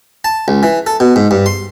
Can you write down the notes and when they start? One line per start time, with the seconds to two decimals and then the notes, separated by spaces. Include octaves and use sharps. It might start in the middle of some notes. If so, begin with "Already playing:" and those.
0.24 A5
0.48 C#2
0.63 E3
0.87 A4
1.00 B2
1.16 G#2
1.31 G2
1.46 C6